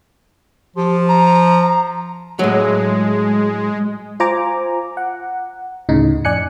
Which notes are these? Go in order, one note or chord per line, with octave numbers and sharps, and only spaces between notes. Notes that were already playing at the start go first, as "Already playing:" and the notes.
F3 G4
A#5
A2 F#3 G#3
F4 C5 G#5 A#5 D6
F#5
D2 A2 C#3 D#4
F2 D5 G#5 F#6 C#7